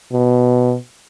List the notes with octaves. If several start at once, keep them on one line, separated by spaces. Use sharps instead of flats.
B2